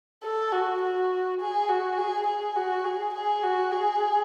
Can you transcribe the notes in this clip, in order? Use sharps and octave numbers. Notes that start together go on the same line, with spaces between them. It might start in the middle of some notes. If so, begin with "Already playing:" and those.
A4
F#4
F#4
G#4
F#4
G#4
G#4
F#4
G#4
G#4
F#4
G#4